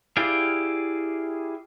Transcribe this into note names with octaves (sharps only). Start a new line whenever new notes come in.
E4 G4 G#4 D5 F5